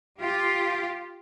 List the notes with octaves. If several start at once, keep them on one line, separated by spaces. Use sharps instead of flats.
F4 G4